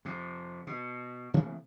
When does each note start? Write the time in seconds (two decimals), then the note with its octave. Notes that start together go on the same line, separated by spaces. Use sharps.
0.05 F2 C3
0.67 B2
1.34 C3 E3 A3 A#3